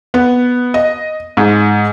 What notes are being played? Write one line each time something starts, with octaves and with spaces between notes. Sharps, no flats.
B3
D#5
G#2